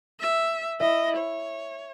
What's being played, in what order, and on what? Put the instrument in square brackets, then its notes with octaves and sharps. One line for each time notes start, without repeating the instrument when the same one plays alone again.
[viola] E5
[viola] E4 D#5 [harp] E5
[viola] C#5